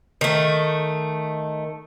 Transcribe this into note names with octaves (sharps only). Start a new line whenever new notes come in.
D#3 A3